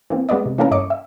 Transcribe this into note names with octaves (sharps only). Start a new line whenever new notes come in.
E3 A#3 C4
G#3 B3 B4 D5 D#5
C3
E3 A3 A#3 C#4 A4 A#4
G2 C#5 D#5 D6 C#7
E5